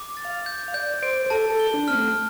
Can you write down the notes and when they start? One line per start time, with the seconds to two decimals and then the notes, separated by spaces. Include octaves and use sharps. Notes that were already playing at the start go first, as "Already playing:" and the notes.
Already playing: D6
0.17 A6
0.25 F5
0.46 G6
0.68 F5
0.74 D5 G6
0.94 D5
1.02 C5 D7
1.26 C5
1.30 A4 A5
1.52 A4
1.59 G7
1.74 D4
1.88 C4 F6
1.95 A3